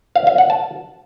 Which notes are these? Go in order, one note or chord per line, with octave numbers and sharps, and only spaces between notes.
F5
F5
F#5
A5